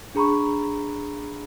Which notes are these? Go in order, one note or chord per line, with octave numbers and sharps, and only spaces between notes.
D4 G#4 A#5 B5 C#6